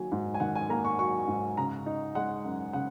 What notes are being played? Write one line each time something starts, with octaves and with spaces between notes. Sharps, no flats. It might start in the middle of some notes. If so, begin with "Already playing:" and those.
Already playing: D#3 F#3 A#3 G#5
G#2
G#5
D#3 F#5
G#5
A#3 A#5
C#6
F#3 C#6
G#2
C#3 A#5
D#4
G#3 F#5
F#2
C#3 F#5